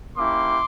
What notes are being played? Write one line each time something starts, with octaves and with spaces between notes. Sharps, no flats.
A#3 C#4 E4 G4 C6 D6